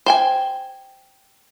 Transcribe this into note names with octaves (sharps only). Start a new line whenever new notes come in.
C5 G5 G#5